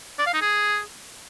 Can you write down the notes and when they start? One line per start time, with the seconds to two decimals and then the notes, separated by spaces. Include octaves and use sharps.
0.19 D5
0.26 F5
0.34 D#4
0.42 G#4